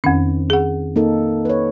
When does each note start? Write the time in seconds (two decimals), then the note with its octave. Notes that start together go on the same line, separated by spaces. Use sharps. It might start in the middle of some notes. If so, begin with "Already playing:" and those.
0.04 F2 D#3 C4 C#4
0.50 G#4 F#5
0.96 A#3 D#4 A4
1.45 B4 C#5